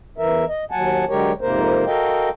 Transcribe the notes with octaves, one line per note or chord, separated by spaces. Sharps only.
E2 E3 A#4 E5
D#5
D#2 F#3 F#5 G#5 A5
D3 F#3 G#3 G4 A#4 C#5
F2 G#2 C3 A#3 A#4 C5
F#4 A4 A#4 D#5 F5 G5